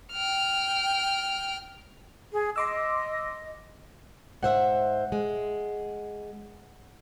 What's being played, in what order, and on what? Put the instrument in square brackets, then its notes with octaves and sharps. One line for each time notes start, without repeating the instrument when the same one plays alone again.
[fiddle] G5 F6
[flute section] G#4
[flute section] D#5 [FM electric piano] C6 D6 E6
[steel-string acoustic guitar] G#2 C5 E5 [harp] F#5
[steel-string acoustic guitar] G#3